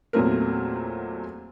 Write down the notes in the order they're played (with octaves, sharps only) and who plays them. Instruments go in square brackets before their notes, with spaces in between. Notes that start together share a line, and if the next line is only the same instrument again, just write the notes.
[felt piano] E2 A#2 F#3 A3 C4 A#4